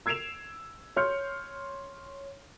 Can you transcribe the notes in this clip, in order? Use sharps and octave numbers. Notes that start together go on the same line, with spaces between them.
E6 G#6 C7 D7 E7 F7
C#5 C6 F6 G6 C#7